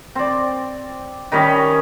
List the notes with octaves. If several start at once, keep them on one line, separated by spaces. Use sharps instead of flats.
C4 D5
D#3 G3 C#4 D#5